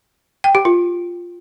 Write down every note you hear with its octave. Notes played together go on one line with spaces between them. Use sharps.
G5
G4
F4